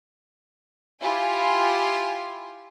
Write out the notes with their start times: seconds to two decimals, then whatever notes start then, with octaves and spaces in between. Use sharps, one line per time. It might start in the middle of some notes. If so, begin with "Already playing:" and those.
1.03 E4 F4 G4 G#5 C6